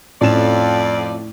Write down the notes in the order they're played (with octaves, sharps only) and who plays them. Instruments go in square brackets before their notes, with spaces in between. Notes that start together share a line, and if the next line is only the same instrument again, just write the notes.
[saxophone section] F2 D5 [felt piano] A2 C#4 E7